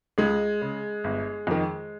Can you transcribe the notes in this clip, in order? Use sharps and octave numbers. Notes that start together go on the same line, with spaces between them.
C#2 G#3
C#3
G1
F2 D#3